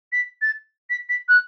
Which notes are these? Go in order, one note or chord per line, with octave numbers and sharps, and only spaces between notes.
B6
A6
B6
B6
F#6